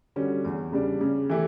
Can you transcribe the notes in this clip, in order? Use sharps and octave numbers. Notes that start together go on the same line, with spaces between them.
D3 G3 C#4 F#4
E2
C#3 G3 D4
C#3
E3 A3 E4 G4